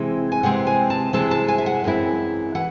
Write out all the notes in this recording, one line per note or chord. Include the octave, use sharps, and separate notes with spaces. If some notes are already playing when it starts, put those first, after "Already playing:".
Already playing: C3 E3 G#3 C4 E4
G#5
C3 E3 G#3 C4 E4 F#5
G#5
A5
C3 E3 G#3 C4 E4 A5
A5
G#5
E5
F#5
F#2 E3 G#3 C4 E4
E3 F#5